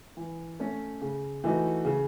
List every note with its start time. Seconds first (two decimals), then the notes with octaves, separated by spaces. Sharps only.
0.17 E3
0.60 A3 C#4
1.01 C#3
1.44 E3 A3 D#4 F#4
1.85 C#3